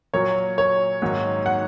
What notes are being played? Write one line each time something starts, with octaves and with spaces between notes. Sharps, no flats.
A#2 F#3 A#3 C#5
C#5
G#2 D#3 F#3 A#3
F#5